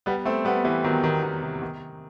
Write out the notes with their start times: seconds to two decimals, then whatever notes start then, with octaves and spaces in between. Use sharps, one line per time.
0.06 G3 B3
0.25 A3 C4
0.45 G3 B3
0.64 E3 G3
0.84 D#3 F#3
1.04 D#3
1.23 D#3
1.43 C3
1.62 D#3